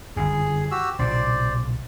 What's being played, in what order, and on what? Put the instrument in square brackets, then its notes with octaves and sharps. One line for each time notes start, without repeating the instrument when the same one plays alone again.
[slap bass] G1 F#2 [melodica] G#4
[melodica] F#4 G4 E6
[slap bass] B1 A#2 C#3 [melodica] C5 D5